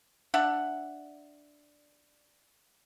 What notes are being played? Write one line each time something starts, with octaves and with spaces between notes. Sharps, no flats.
D4 E5 F#5